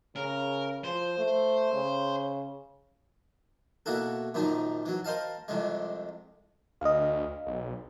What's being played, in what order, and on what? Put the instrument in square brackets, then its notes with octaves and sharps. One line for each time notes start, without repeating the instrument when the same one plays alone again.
[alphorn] C#3 [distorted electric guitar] A#4
[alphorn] F3 [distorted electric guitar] C5
[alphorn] A3
C#3
[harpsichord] B2 A#3 E4 F#4 A4
F#2 A#2 D#3 F3 D#4
E3 F#3
A#4 C5 D#5 F5 A5
C2 F2 C3 G#3
[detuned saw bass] D2 [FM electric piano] D#5 F5
[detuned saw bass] B1